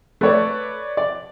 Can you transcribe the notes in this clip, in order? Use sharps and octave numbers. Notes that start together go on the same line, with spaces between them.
A3 B4 C#5 D5
D5